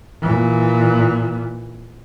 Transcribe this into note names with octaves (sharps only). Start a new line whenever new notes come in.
A#2 E3